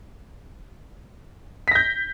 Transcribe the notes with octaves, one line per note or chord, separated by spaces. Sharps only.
G6 A#6 B6